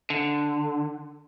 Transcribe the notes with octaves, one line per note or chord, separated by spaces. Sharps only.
D3